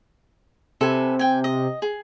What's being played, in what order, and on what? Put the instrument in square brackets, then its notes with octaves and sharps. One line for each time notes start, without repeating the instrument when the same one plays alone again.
[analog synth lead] C3 [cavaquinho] A4 B4 G#5
[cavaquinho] G5 G#5
D#5
G#4